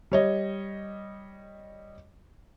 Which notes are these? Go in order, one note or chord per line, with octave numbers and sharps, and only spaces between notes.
G3 C#5 D#5